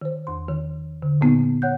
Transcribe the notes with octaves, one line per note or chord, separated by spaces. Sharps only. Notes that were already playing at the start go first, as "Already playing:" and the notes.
D#3 C5
E2 C6
D#3
D3
A#2 A#3 B3 D#4
C#5 F#5 F#6 G6